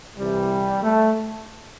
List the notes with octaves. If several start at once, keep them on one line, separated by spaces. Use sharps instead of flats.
C2 C3 E3 G3
A3